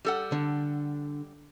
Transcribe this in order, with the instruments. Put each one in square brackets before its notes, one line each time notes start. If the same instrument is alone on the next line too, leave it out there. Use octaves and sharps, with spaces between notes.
[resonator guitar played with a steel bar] G3 A4 F#5
[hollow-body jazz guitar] D3